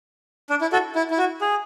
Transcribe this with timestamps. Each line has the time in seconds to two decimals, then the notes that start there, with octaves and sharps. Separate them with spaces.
0.50 D4
0.61 E4
0.73 F#4 A4
0.95 E4
1.11 E4
1.18 F#4
1.41 G#4